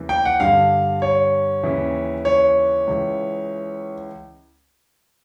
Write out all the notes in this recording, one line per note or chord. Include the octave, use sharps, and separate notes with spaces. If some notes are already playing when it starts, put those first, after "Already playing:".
Already playing: D#2 C#3 E3
G5
F#5
G2 D3 F5
C#5
D#2 C#3 E3
C#5
C#2 C#3 E3